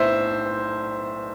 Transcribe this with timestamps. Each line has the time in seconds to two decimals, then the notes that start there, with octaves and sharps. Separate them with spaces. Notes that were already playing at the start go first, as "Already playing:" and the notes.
Already playing: B1 A2 C5 E5